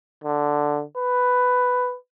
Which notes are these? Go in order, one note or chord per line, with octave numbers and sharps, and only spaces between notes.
D3
B4